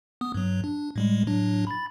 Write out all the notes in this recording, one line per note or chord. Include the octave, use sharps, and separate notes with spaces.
B3 D#6
G2 F#3
D4
A2 G3 G#3
A2 F#3 D4
B5 A6